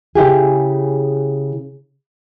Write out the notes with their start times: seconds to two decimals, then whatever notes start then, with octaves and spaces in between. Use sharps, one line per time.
0.15 C#3 E4 G4 G#4